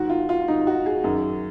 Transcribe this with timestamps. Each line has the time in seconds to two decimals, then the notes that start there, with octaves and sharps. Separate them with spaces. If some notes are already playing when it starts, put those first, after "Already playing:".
Already playing: G#2 D#3 F#4
0.10 F4
0.29 F4
0.48 G#2 D#3 D#4
0.67 F#4
0.86 G#4
1.04 F#2 D#3